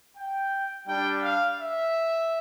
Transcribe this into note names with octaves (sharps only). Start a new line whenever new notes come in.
G5
G3 D4 G4 G5
F5
E5